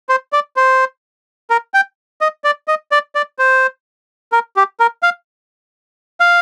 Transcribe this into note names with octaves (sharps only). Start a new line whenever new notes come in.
C5
D5
C5
A#4
G5
D#5
D5
D#5
D5
D5
C5
A#4
G4
A#4
F5
F5